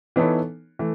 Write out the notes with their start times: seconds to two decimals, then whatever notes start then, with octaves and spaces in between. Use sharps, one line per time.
0.16 E3 B3 D#4 A4 C#5
0.79 E3 A3